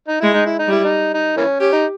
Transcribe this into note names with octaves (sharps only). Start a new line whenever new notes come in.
D#4
G#3 E4
D#4
E4
D#4
G3 E4
D#4
D#4
E3 A#3 C#4
C#4 G4
D#4